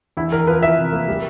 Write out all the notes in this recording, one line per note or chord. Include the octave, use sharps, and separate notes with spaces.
E2 E4
E2 A#4
F3 B4
E2 E5
C3
A#3
G3